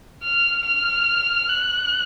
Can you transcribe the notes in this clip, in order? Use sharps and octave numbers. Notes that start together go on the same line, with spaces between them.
F6
F6
F#6